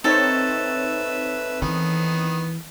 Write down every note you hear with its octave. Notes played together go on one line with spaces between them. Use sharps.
C4 D#4 A4 B4 C#5 E5
D#3 E3 B3